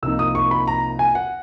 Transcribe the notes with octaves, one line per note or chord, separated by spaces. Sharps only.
C2 C3 F3 A#3 D#4 E6
D#6
C#6
B5
A#5
G#5
F#5